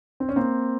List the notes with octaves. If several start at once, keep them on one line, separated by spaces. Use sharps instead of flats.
C4
C#4
A#3 C4